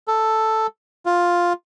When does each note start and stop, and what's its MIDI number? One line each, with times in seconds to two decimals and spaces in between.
0.08 0.67 69
1.06 1.53 65